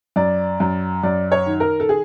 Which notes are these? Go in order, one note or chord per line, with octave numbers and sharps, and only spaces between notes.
F#2 D5
F#2
F#2 D5
C#5
D#3
A#4
A4
G#4